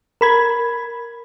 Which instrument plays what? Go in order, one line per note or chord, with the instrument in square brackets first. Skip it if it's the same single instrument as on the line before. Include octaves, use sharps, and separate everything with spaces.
[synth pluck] A#4 B5 G#6